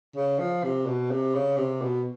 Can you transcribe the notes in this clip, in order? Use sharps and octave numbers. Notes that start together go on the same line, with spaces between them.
C#3
F3
C3
B2
C3
C#3
C3
B2